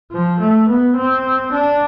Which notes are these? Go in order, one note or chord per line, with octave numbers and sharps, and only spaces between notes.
F3
A3
B3
C4
D4